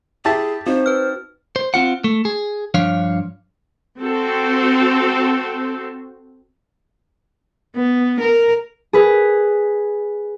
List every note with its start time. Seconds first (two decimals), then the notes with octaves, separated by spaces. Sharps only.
0.25 E4 G4 G#4 E5 A5
0.67 C4 D#4 F#4 C5
0.86 B4 F6
1.56 C5
1.74 C4 F4 F#5
2.04 A3
2.25 G#4
2.74 G2 F3 D4 C#5 F5
4.00 C4 F#4 A4 C5
7.76 B3
8.20 A#4
8.93 G#4 B4